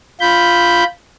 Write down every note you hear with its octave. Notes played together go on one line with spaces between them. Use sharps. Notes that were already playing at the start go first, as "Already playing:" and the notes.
F4 B5 G6